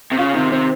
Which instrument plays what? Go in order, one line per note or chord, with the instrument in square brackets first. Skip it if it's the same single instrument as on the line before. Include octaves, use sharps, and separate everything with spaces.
[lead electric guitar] C3
[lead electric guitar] C#3 [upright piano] F4
[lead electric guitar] C3 [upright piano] D#3
[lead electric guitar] C3 [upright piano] C4